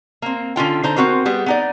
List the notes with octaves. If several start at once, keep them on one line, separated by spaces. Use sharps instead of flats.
A#3 C4
D3 C#4 F4 G5
D3 D#4 C5
B3 C4 F#4 A#4 C5
G3 B3 G#4
B3 D#4 D5